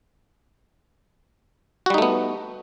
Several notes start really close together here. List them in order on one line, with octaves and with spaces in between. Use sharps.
F#4 G3 D#4 A3 B3